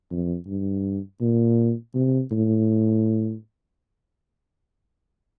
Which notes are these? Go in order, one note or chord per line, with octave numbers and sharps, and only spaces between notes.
F2
G2
A#2
C3
A2